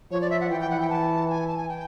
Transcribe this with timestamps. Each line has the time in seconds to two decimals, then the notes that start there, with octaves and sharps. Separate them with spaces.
0.11 F3 C#5
0.21 D5
0.30 E5
0.41 F#5
0.50 E3 G5
0.60 G5
0.70 F#5
0.80 G5
0.90 A5
1.30 G#5
1.47 A5
1.57 G#5
1.69 G5